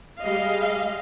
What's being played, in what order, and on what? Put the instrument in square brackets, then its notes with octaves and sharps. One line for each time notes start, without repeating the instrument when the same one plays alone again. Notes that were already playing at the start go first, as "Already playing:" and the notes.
[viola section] G3 G#3 D#5 F5